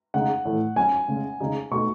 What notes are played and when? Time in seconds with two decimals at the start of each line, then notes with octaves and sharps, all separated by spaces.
0.14 C#3 G#3 D#4 F#5
0.45 A2 E3 A3
0.76 F#3 C#4 F#4 G#5
1.08 C#3 G#3 C#4
1.40 C#3 G#3 D#4 G#4
1.71 B2 A3 D#4 F#4 C#6